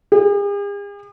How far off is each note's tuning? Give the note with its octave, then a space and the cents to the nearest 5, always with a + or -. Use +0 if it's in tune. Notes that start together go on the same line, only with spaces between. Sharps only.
G#4 -45